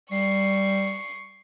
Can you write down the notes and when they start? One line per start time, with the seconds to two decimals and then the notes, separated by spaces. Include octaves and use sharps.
0.12 G3 C#6 C7